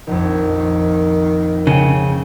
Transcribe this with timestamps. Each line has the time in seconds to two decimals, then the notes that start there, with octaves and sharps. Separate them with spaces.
0.07 A#1 F2 D#3
1.67 C#3 G5 D#7